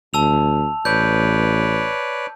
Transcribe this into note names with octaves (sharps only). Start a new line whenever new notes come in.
D2 A5 E6 F7
A1 B4 C#5 D5 G6